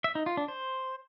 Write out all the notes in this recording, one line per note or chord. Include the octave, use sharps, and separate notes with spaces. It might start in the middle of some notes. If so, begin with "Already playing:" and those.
E5
D#4
F4
D4
C5